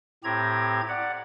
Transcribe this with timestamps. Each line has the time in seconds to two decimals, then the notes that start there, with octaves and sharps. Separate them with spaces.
0.24 A2 C4 G4 A#5 G#6
0.88 D5 F#5